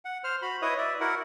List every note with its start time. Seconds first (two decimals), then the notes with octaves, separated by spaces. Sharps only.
0.05 F#5
0.24 C5 F6
0.42 F#4 B5
0.62 E4 B4 C#5 D#5 E5 D#6
0.78 D5 E5
1.00 E4 F#4 A#4 F#5